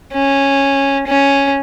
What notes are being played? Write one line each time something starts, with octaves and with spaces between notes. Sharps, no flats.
C#4
C#4